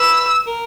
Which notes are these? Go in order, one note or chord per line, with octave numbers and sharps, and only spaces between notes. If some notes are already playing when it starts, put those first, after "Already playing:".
Already playing: B4 E6
A#4